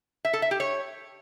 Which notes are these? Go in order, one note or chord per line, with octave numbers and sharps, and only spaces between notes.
E5
A4
E5
G4
C#5